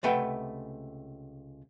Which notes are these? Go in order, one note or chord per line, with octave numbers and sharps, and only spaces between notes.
C#2 C3 A3 B4 F#5 G5